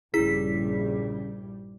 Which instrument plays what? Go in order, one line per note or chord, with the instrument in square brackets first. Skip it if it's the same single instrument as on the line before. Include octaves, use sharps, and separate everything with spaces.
[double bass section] A#1 G2 G3 [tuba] C#3 [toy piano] E4 [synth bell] G#4 B6